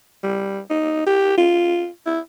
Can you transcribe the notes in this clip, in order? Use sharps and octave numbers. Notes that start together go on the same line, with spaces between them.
G3
D#4
G4
F4
E4